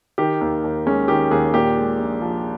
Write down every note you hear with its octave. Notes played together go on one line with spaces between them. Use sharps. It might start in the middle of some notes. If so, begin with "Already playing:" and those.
D#3 G4
D#2
D#2
G#3 C#4
D#3 G4
D#2 G#4
A#2 G4
G#3
A#1
F3